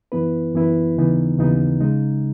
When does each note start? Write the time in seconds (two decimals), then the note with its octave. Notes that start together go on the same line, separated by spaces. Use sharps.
0.12 F#2 E3 B3 E4 B4
0.54 F#2 E3 B3 E4 B4
0.96 D#2 C#3 E3 B3 D#4
1.38 D#2 C#3 E3 B3 D#4
1.80 C#3 G#3 D#4